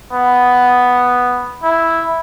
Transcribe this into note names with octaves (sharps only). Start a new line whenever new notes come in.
B3
E4